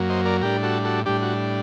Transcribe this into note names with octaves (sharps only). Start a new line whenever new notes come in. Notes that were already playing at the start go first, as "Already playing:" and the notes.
Already playing: F#2 F#3 A#3
C5 D#5
A#4 D5
A2 G3 D4 G4 A#4
F#4 A4
F#4 A4
A2 G3 D4 G4
F#4